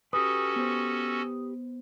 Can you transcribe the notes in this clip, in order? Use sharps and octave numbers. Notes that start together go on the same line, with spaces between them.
C#4 F#4 G4 A4 B4 D#6
B3 C5